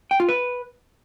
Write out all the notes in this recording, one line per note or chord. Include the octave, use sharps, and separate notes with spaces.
G5
F4
B4